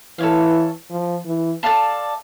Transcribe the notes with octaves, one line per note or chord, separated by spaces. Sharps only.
E3 A4 C#5 F5
F3
E3
A4 D5 F5 A5